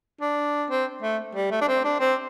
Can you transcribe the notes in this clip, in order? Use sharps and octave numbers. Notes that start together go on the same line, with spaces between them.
D4
C4
A3
G3
A3
D4
C4
D4
C4